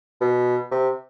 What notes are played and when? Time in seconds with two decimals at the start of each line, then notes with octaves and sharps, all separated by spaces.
0.21 B2
0.71 C3